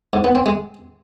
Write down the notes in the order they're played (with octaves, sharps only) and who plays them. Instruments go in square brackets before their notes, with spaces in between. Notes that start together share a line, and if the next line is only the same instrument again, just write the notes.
[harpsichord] G#2
B3
C4
G#3